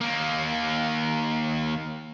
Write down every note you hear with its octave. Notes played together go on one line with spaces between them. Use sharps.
D#2 A#3